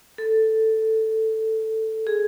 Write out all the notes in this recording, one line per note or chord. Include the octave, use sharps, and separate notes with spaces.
A4
G#4